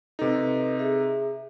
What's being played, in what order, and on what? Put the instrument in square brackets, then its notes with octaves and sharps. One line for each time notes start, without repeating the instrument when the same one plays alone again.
[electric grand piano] C3 D#4 [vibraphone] A4 B4 D#5
[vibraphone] G#4 E5